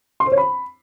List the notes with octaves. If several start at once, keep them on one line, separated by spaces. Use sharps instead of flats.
C6
C5
C#5
B5